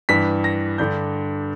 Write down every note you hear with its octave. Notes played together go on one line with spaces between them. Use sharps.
G2 E3 B6
A#6
G2 D3 G6